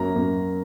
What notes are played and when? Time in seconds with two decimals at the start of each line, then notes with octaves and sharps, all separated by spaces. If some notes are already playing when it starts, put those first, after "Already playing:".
Already playing: F#2 F#3 A#3 A#5
0.16 F#2 F#3 A#3